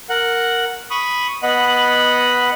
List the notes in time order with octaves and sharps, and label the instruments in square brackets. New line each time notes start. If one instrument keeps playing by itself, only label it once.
[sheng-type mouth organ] A#4 F#5
B5 C#6 D#6
B3 D#5 F#5 B5